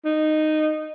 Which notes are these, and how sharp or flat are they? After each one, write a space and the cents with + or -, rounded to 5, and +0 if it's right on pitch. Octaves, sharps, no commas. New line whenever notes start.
D#4 -10